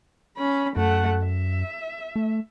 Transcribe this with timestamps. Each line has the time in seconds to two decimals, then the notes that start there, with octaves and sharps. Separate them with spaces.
0.37 C#4 B5
0.76 F#2 A3 F#5
1.25 E5
2.16 A3